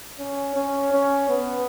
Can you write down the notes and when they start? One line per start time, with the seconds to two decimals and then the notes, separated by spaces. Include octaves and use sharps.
0.19 C#4
0.56 C#4
0.92 C#4
1.29 B3